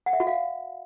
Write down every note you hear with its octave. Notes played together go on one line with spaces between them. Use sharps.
F#5
E5
F#4
F5